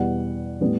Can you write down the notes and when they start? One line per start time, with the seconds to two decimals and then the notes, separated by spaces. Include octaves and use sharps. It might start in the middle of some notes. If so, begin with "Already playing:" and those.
Already playing: E2 B2 G3 B3 F#5
0.61 A2 G3 B3